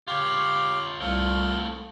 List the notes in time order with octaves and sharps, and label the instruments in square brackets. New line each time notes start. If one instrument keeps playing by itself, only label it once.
[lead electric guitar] F4 C#5 [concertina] G4 F5
[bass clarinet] C2 [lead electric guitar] A3 C4 [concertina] F4